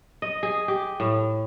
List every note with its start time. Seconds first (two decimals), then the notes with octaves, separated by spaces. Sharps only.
0.22 D#5
0.43 G#4
0.68 G4
1.00 A2